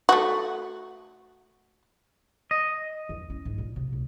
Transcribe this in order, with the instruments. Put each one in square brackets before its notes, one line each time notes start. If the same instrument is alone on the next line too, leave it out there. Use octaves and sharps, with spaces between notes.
[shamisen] A3 F#4
[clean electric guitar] D#5
[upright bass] E2
C#4
G#2
A#2
C3
C#2